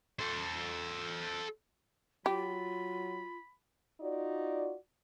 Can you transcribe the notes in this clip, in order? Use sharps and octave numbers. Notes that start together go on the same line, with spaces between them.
A4 C5
F#3 F4 G4 B5
D#4 F4 F#4 D5